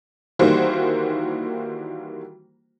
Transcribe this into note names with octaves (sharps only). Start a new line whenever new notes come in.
D#3 E3 G3 A#3 F#4 C5